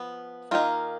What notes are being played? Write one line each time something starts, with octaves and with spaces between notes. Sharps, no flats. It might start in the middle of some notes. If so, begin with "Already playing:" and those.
Already playing: F3 B3
D#3 A#3 D#4 F4